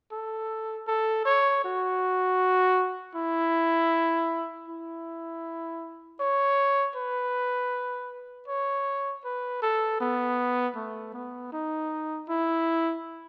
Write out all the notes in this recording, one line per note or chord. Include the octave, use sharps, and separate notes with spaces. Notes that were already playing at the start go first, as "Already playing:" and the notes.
A4
A4
C#5
F#4
E4
E4
C#5
B4
C#5
B4
A4
B3
A3
B3
D#4
E4